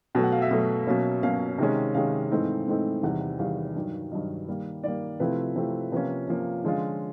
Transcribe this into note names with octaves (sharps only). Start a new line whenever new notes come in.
B2 F#3 A3 G5
F#5
F5
E5
B2 F#3 A3
B2 F#3 A#3 C#4
B2 F#3 A#3 C#4 F5
C3 D#3 G#3 C#4
C3 D#3 G#3 C#4 F5
G#2 E3 A3 C4 D#4
G#2 E3 A3 C4 D#4
E2 C3 D#3 G3 F#5
F#5
E2 C3 D#3 G3 F5
G2 D#3 F#3
G2 D#3 F#3 D#5
D#3 G3 A#3
D#3 G3 A#3 D5
C3 F3 A3 C4 E4 B4
C3 F3 A3 C4 E4
C3 F3 A#3 C#4 B4
C3 F3 A#3 C#4
D3 F3 G#3 C#4 F4